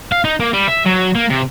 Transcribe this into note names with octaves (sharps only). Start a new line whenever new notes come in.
F5
D#4
A#3
G3
E5
F#3
A#3
C3